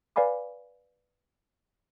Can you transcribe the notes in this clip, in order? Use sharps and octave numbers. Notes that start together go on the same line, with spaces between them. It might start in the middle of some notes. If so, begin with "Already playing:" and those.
B4 D5 F5 G#5 B5 D6